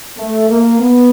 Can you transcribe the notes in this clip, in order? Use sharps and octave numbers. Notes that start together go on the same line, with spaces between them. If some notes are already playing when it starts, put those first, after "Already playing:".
A3
A#3
B3